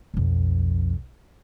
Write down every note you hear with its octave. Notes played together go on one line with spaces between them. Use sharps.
B1 F2